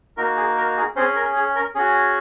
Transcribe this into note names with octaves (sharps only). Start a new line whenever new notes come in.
A#3 D#4 F#4 A#4
G#4
A#4
G#4
C4 C#4 G#4 C5
A#4
G#4
A#4
C#4 F#4 G#4